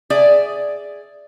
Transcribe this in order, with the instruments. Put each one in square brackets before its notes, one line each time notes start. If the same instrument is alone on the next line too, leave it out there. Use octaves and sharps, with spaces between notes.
[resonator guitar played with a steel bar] G#4 D5 E5